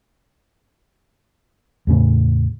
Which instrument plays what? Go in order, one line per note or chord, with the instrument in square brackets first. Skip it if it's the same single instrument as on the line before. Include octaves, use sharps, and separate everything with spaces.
[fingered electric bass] E2 A2 C#3